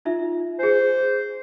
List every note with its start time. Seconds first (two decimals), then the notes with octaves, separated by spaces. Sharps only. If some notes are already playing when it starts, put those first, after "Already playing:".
0.05 D#4 F4 E5
0.59 G#4 C5 G#5